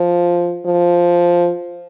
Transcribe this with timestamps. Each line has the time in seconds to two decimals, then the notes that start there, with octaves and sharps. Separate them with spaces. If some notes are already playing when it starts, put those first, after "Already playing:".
Already playing: F3
0.66 F3